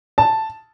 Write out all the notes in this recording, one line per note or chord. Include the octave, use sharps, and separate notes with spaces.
A5